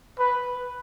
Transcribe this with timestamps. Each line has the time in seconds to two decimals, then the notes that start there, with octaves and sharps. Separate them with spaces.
0.19 B4